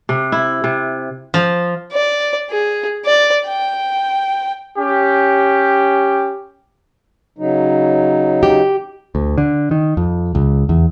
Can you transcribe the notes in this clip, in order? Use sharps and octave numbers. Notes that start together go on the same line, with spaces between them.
C3
E4
C3
F3
D5
G#4
D5
G5
C#4 G4
C#3 F#3 D#4
G4
D2
D3
D#3
F2
C#2
E2